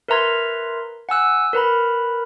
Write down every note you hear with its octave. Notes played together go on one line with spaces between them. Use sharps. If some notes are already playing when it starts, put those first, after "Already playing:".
A#4 B4 E5 A#5 C6 G#6
F#5 G#5 E6 F#6
A#4 B4 A#5 B5